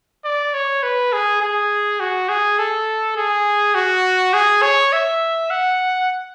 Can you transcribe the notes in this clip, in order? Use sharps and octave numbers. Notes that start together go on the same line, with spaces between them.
D5
C#5
B4
G#4
G#4
F#4
G#4
A4
G#4
F#4
G#4
C#5
E5
F#5